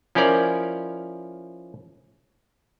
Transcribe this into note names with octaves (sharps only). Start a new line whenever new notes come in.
F3 C#4 E4 A#4 D5